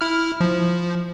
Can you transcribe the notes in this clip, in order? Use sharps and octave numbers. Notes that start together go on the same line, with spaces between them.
E4 F6
F3